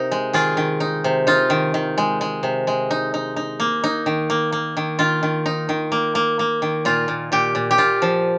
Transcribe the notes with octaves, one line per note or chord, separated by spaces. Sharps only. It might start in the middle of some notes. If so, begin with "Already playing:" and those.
Already playing: C3 D#4 A#4
G#3
D#3 F4 G#4
D#3
D#4
C3
D#4 F4
D#3
D#3
G#3
G#3
C3
G#3
D#4
D#4
D#4
A#3
D#4
D#3
A#3
A#3
D#3
D#3 F4
D#3
D#4
D#3
A#3
A#3
A#3
D#3
A#2 F4
A#2
A#2 G4
A#2
G4
A#2 F4
F3